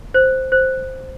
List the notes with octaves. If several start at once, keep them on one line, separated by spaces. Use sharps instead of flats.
C5
C5